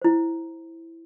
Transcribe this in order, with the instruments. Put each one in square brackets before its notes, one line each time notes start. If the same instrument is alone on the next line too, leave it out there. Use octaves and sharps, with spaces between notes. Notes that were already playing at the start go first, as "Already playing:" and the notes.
[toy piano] E4 C5